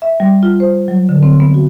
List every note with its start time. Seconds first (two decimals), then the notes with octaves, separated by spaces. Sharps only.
0.02 E5
0.20 G3
0.43 F4
0.60 C5
0.88 F#3
1.09 D3
1.23 C4
1.40 B3
1.54 F#4